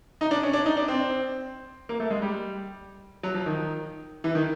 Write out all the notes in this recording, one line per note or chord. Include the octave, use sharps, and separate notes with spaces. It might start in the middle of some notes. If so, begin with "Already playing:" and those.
D#4
D4
C#4
D4
D#4
D4
C4
A#3
A3
G#3
G3
F#3
F3
D#3
E3
D#3